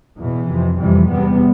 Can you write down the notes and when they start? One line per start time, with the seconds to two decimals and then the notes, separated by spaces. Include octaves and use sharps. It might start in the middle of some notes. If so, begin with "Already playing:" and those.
0.17 E2 B2 E3
0.48 F2 C3
0.79 F2 C3 E3 G3
1.09 E2 C3 G3 B3